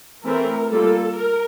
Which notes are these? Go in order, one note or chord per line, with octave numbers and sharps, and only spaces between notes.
E3 A3 C4 E4 A#4
G3 A#3 F4 A4
A#4